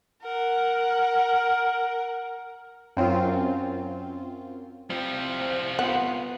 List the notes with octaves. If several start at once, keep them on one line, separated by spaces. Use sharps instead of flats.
A#4 F#5
F#2 C4 C#4 F4
F3 G3 C4 C5
B3 F4 F#5